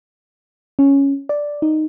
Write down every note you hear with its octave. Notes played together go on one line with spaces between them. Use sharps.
C#4
D5
D#4